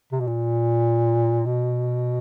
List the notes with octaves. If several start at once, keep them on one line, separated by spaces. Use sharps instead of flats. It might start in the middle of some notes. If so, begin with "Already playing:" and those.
C3
B2
A#2
B2